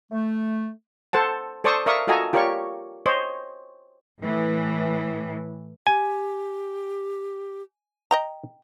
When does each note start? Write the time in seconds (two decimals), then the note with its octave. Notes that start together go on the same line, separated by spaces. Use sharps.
0.11 A3
1.13 A4 C5 F#5 A5
1.64 A4 C5 D5 A5 C#6 D#6
1.86 A#4 D5 E5 F5 C#6 D#6
2.07 F4 F#4 A4 D#5 G#5 A#5
2.33 F4 G4 A#4 C#5 D5 C#6
3.06 C5 C#5 D#5
4.19 A2 E3
5.87 G4 G#5
8.11 D#5 G5 A#5